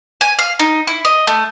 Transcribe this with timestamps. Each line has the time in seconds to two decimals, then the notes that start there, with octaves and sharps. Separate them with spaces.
0.21 G#5
0.39 F5
0.59 D#4
0.87 E4
1.05 D#5
1.27 A3